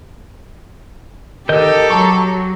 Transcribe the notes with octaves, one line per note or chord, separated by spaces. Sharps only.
D#3 G4 A4 A#4 D#5 G6
F#3 A5 A#5 C#6